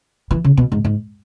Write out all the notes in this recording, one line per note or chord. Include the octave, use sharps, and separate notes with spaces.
E3
C#3
B2
G#2
G#2